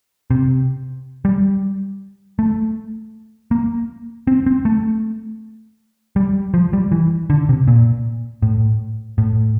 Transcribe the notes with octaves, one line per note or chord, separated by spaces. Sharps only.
C3
G3
A3
A#3
C4
C4
A3
G3
F3
G3
E3
D3
C3
A#2
A2
A2